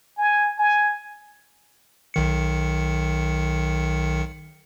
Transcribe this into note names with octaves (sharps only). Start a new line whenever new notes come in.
G#5
G#5
B1 D#3 C#7